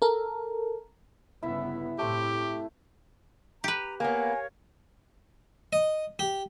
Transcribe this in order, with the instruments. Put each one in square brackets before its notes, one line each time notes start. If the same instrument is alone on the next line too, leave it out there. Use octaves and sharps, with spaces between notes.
[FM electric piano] A4 A#4
[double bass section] G1 C#3 B3 [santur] E4 E5
[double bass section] A2 C3 [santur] A3 E4 C5 [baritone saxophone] G4
[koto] G4 B4 [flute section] A#5
[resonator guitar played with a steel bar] A#3 B3 [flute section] A#4 C#5 F5 [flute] G#5
[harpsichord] D#5
G4